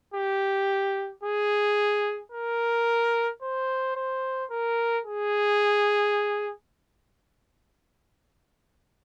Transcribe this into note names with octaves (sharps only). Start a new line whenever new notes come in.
G4
G#4
A#4
C5
C5
A#4
G#4